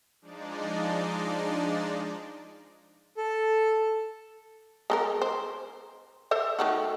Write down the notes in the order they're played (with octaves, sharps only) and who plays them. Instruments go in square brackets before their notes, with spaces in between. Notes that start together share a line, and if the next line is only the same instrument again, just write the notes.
[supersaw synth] F3 G#3 D4 D#4 D5
[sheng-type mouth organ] A4
[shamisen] G#3 A4 A#4
C5
A4 C5 E5
D#3 A3 F#4